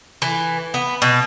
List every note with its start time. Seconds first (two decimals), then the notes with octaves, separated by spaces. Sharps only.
0.22 E3
0.74 B3
1.02 B2